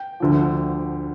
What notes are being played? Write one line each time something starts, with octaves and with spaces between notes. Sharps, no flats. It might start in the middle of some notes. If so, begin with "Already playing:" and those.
Already playing: G5
D2 D3 F3